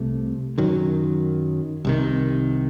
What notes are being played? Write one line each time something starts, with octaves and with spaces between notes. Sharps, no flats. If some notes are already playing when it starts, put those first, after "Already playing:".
Already playing: C2 C3 A3
F#2 D#3 F#3
C2 C3 D#3